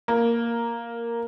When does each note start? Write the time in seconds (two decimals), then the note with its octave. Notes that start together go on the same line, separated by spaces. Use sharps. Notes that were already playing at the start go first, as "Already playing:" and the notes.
0.08 A#3